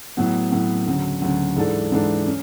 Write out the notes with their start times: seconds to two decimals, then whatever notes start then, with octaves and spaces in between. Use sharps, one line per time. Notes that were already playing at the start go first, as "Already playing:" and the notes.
0.17 A2 F#3 B3
0.52 A2 F#3 B3
0.86 D2 C#3 F#3
1.22 D2 C#3 F#3
1.56 G#2 E3 G#3 D4 A4
1.92 G#2 E3 G#3 D4 A4
2.27 C#4